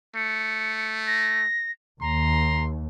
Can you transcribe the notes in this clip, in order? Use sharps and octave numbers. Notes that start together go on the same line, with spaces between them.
A3 C#7
A#6
D#2 A#5 C6